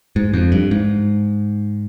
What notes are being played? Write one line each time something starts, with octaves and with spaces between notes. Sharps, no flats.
G#2
F2
G2
G#2